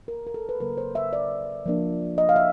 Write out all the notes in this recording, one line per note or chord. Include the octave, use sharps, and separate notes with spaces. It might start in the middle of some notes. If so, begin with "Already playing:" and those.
A#4
A#4
A4
B4
C#3 F#3 A#3 A#4
C5
E5
D5
F3 A#3 D4
D#5
F5
E5